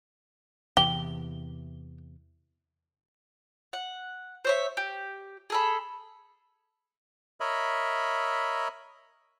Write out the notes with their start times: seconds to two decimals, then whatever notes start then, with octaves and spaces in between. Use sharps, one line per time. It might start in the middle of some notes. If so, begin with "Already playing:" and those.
0.77 E2 C3 E3 G4 G7
3.73 F#5
4.45 C5 C#5 E5
4.77 G4
5.50 G#4 A4 B5
7.40 A#4 C#5 D#5 E5 B5